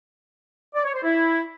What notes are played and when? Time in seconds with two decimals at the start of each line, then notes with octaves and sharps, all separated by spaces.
0.75 D5
0.84 C#5
0.94 C5
1.04 E4